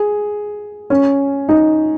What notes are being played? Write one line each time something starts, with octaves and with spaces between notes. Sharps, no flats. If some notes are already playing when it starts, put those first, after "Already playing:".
Already playing: G#4
C#4
D#4